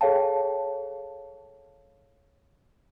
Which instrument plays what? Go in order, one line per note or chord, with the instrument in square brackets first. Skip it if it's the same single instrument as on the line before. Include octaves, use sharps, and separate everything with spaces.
[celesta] G#4 A4 C#5 F5 G5 A5